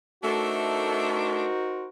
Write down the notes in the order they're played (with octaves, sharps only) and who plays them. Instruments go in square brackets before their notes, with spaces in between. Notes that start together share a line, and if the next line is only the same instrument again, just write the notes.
[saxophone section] A3 [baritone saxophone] D4 [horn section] D#4 A#4 C5 [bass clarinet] F#4